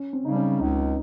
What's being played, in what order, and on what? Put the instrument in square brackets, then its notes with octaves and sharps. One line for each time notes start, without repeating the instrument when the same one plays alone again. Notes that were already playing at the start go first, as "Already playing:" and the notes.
Already playing: [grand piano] C#4
C4
[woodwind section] C#3 G3 [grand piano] D#4
[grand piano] C#4
[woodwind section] C#2 [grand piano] D#4